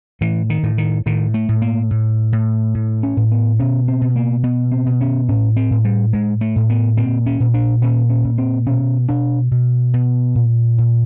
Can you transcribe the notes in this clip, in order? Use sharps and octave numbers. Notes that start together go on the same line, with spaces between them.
A2 E3
D#3
A2
D#3
A2 D#3
A3
A2
A#3
A2
A2
A2
C#4
A2
B3
B2 C#4
C4
B2
A#3
B2 B3
C4
B2
C#4
A2 C#4
C4
A2
G3
A2 G#3
A3
A2
B3
A#2 C4
C#4
A#2
D4
A#2 C#4
C#4
A#2
C4
B2 C#4
B2 D4
B2
B2
A#2
A#2